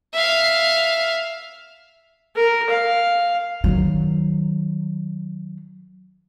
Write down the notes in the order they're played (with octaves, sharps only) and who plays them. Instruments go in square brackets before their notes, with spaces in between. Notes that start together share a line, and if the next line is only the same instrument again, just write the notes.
[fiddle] E5 F5
[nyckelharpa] A#4
F5
[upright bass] D#3 F#3